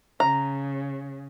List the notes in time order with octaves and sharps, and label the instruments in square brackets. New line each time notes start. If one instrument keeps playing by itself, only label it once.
[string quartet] C#3 [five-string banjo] A#5